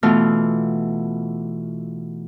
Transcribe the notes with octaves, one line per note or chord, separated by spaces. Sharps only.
B2 E3 A3 F4 F6